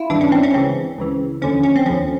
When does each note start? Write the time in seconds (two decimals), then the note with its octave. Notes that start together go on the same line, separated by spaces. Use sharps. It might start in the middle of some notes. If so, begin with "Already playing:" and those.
Already playing: E4 F4
0.10 G#1 G2 E3 D4
0.21 C#4
0.32 C4
0.43 C#4
0.54 C#2 C#3 E3 C4
0.98 C#2 C#3 E3
1.42 D#2 D3 F3 C#4
1.63 C#4
1.76 C4
1.86 D#2 D3 F3 C#4